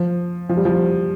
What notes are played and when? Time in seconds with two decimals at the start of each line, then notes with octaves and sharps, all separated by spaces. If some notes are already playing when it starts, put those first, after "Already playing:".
Already playing: F3
0.49 F3
0.57 G3
0.65 F3